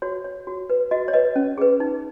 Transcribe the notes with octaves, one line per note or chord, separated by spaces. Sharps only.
F#4 C#5
C#5
F#4
B4
F#4 D#5
C#5
B4 D#5
C#4
G#4 B4
D#4